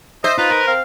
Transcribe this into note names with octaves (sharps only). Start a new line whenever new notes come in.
C5 D#5 E5
D#4 F4 B4
A#4
C4 F5